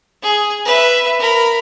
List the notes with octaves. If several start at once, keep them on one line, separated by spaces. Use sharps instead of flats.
G#4
B4 E5
A#4 B5